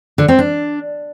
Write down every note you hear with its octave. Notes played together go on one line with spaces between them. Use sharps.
D3
C4
D4